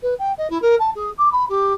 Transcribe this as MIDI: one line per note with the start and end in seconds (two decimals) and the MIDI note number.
0.02 0.14 71
0.18 0.32 79
0.37 0.49 75
0.49 0.60 64
0.61 0.75 70
0.79 0.89 81
0.95 1.10 68
1.17 1.30 86
1.32 1.45 83
1.49 1.73 67